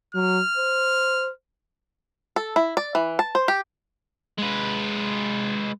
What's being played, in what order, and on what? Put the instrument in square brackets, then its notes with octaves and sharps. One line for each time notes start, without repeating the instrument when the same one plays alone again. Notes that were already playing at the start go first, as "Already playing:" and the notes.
[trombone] F#3 [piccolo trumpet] F6
[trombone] C5
[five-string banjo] A4
E4
D5
E3
A5
C5
G4
[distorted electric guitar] G#3 B4